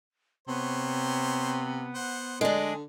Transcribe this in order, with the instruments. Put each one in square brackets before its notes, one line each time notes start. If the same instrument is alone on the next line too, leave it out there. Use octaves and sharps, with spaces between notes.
[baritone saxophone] C3 [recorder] B3 [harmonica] C5 C#5
[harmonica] C5 F#5
[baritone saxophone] D3 [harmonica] F#3 D#6 [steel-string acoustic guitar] G#3 D4